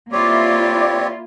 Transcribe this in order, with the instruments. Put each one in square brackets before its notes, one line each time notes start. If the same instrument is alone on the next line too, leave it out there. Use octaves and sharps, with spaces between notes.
[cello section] A#3 E4 F4 [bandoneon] C4 G4 C#5 [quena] D5 [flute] D6